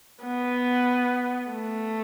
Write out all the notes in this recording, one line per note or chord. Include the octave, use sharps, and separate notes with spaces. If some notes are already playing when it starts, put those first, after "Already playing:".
B3
A3